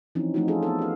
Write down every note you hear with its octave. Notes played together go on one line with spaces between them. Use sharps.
E3 F3 C4 C#4 D#4
F3 A3 D#4 F4 F#4
C#4 F4 G#4 A4
B3 A4
G4 F5